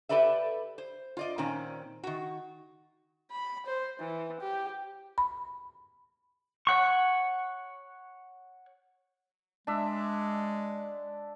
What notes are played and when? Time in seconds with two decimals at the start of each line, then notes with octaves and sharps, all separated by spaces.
0.09 G4 A4 B4 D5 E5
0.78 C5
1.17 F4 D5 D#5
1.38 A#2 D#3 C4 C#4
2.03 D#3 F#4
3.31 B5
3.66 C5
4.00 E3
4.41 G4
5.18 B5
6.67 C#5 F#5 C#6
9.67 G#3 D4 E5